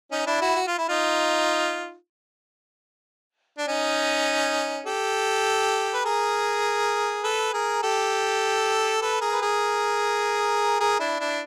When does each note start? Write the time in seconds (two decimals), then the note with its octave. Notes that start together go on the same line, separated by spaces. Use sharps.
0.11 C#4 D#4
0.26 D4 E4
0.41 E4 F#4
0.56 F#4
0.67 F4
0.78 E4
0.88 D#4 F4
3.58 D4
3.67 C#4 D#4
4.86 G4 A4
5.94 B4
6.05 G#4 A#4
7.24 A4 B4
7.53 G#4 A#4
7.83 G4 A4
9.02 A4 B4
9.21 G#4 A#4
9.32 B4
9.42 G#4 A#4
10.80 G#4 A#4
11.00 D4 E4
11.19 D4 E4